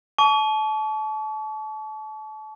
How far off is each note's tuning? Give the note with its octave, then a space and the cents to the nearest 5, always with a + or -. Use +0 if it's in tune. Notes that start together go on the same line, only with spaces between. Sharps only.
A5 -30 C#6 +40